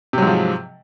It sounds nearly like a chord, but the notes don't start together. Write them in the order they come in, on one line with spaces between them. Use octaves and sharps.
C3 F#3 G#2 F3